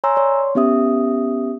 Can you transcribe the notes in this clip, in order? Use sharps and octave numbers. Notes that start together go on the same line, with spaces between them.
C#5 G#5 A#5 C6 E6
C#5 D5 C6
B3 C#4 G4 E5 D#6